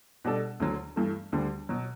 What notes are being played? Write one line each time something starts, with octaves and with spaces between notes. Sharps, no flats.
B2 G3 D4 A4
D2 D3 F#3
G2 E3 A3
D2 D3 G3
B2 F#3